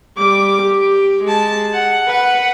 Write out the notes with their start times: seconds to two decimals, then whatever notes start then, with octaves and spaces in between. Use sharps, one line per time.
0.17 G3 D6
0.62 G4
1.24 G#3 A5
1.74 F#5
2.08 B4 F#5